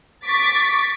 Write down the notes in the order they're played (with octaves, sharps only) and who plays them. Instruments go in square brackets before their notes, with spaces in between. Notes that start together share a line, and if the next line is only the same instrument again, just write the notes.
[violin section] C#6 D6 A6 B6